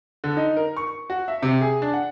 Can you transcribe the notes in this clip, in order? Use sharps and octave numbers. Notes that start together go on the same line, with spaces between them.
D3
D#4
A#4
C#6
F#4
E5
C3
G#4
D4
F#5